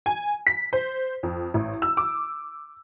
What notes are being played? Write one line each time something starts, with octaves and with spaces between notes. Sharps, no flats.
G#5
B6
C5
F2
A1
E6
D6